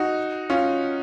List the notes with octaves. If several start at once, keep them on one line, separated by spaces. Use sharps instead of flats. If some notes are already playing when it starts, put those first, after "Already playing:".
Already playing: D#4 F#4
C#4 F4